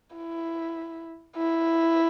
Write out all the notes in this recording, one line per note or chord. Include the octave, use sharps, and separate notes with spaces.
E4
E4